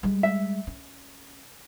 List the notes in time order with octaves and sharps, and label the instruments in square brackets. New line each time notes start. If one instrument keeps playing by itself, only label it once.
[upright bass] G3 G#3
[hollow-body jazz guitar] E5
[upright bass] C#4